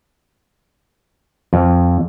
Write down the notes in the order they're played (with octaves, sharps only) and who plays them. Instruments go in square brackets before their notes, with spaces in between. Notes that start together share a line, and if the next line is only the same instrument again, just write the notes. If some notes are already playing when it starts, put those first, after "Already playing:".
[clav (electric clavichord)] F2